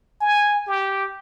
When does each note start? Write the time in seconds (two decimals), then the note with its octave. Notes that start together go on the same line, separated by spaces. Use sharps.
0.21 G#5
0.67 G4